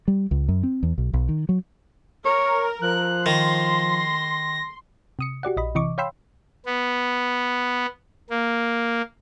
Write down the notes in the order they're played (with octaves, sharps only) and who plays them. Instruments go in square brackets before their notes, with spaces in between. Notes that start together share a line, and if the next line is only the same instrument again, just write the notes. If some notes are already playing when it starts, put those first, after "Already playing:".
[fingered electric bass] G3
C#2
F#2
C4
E2
B1
B1
D#3
F#3
[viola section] A#4 [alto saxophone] C#5
[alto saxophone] F3 [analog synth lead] F#6
[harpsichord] D#3 [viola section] C6 [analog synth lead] A#6
[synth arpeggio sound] C3 D#6 C#7
F#4 G4 D5 F#5
A#1 D#5 B5
C3 E3 D#5 C#6 D6
C#5 F5 G5 B5 C6 E6
[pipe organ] B3
A#3